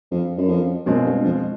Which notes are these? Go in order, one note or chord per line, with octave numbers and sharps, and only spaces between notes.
F2
F#2
F2
F#2 B2 G#3 C4 F4
G2
F2